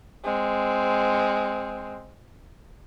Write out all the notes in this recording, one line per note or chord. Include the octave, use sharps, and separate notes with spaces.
G#3 C4